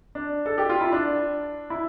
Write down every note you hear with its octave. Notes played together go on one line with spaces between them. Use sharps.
D4
A4
G4
F4
E4
D4
E4